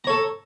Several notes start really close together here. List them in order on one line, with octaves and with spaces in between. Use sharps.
A#5 C#5 A4